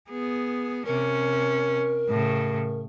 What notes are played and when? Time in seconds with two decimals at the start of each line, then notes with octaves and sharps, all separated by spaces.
0.10 B3 G#4
0.86 C3 C#4 A#4
2.09 A2 C#3